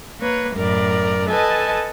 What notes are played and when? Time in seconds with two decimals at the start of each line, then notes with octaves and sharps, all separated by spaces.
0.20 A#3 B4 C#5
0.55 F#2 A2 A#4 D5
1.28 A4 B4 D#5 G#5 A5